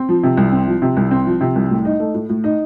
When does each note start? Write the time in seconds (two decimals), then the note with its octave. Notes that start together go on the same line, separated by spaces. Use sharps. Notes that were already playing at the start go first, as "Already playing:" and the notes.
Already playing: C4
0.09 F3
0.23 C3
0.37 C2
0.52 C4
0.67 F3
0.82 C3
0.97 C2
1.11 C4
1.27 F3
1.41 C3
1.56 C2
1.70 A2
1.85 D#4
2.00 A3
2.14 A2
2.29 A2
2.44 D#4